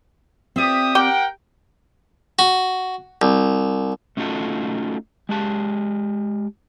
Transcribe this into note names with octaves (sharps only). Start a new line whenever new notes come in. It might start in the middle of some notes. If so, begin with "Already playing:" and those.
C4 F4 G4 D5 E5 D#6
G4 A#4 F#5 G5
F#4
C2
A3 C#4 D#4 F4 F#4 A4
G#3 G4 A5